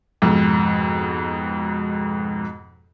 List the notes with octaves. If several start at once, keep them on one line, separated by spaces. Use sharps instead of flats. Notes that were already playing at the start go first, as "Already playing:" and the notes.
F2 G#2 B2